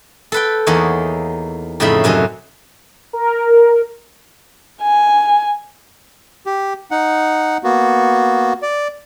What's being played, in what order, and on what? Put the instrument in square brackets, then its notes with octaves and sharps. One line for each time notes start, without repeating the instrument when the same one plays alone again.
[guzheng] A4 B4 G5
E2 A#3 D#4 C#5
F2 A2 C#3 D#4 E4 B5
F#2 C3 F#3 C#4 D#4
[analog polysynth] A#4
[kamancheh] G#5
[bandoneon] G4
D#4 F#5
A#3 B3 F#4
D5